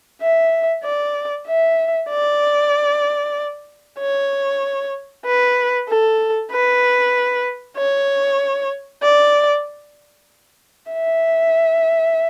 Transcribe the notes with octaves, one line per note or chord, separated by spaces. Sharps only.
E5
D5
E5
D5
C#5
B4
A4
B4
C#5
D5
E5